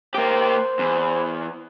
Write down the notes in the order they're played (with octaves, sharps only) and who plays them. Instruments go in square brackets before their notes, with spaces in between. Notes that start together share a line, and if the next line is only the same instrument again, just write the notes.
[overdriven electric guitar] A#3 G4 [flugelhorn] C5
[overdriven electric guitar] E2